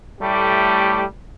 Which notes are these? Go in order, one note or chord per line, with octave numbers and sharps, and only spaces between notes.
A2 G3 A3 G4